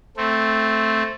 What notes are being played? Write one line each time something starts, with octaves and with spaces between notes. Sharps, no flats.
A3 C4